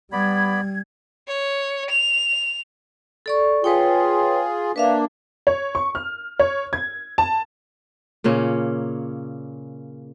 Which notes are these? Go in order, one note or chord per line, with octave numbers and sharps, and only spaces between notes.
G3 B3 D5 B5 G#6
C#5
F7
A4 D5 C#6
F4 G#4 B4 C#5 G5
A#3 D4 B4 E5 F5
C#5
C#6
F6
C#5
G#6
A5
A#2 C#3 A#3 C#4